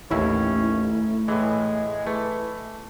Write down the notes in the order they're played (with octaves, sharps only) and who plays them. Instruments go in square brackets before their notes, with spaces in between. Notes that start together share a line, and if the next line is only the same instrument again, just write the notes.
[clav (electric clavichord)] A1 D#2 [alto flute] A3 [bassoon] C#4 [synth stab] E4
[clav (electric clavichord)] A2 E3 [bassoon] G#3
[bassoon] E3 [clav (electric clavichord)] A3